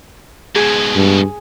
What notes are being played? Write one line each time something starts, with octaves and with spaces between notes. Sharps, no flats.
G#2 B2 G#4
G2